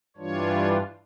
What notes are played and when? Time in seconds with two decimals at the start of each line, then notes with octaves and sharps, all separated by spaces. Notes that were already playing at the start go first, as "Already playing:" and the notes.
0.17 G2 E3 G3 D4 F4 C#5